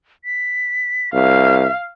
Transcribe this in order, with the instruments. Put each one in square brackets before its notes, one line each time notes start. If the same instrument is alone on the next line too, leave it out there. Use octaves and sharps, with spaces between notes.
[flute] B6
[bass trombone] C2 [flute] E5 [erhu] F5